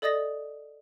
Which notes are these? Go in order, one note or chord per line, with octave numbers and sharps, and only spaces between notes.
A4 D5 D#5 D#6 A6 A#6